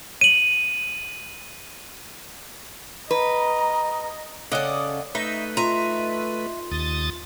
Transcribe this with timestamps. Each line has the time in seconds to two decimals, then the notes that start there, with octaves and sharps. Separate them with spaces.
0.21 D#7 F#7
3.11 B4 D#5 A#5
4.52 C#3 A4 D5 D#5 F#5
5.15 A3 D#4 B4 E5
5.57 F4 E5 A#5 C6 D#7
6.71 D#2 D#6 A6